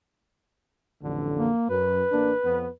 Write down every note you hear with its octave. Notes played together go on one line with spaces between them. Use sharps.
A1 F2 D3
A#3
F#2 B4
A1 A#3 D4
F2 B3